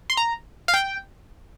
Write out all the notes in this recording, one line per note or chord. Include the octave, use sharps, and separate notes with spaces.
C6
A#5
F5
G5